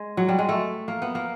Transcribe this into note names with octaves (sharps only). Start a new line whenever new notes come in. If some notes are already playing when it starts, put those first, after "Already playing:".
Already playing: G#3
F#3
G3
G#3
A3
A#3
B3
A#3